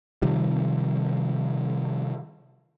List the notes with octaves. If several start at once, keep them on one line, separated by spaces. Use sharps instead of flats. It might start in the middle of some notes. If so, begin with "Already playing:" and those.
C3 D#3 F3 G3